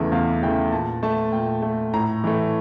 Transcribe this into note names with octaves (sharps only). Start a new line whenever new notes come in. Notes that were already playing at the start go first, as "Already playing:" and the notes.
Already playing: E2 C#3 E3 A3 E5
E2 F5
C#3 E3 A3 G5
A#2 A5
A3 A5
A#2 G5
A3
A2 A#5
E3 A3